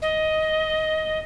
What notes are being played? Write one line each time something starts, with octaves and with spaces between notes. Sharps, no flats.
D#5